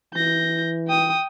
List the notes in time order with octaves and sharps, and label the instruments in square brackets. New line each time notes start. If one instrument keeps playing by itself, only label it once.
[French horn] E3 [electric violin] G6 A#6
[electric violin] G5 D#6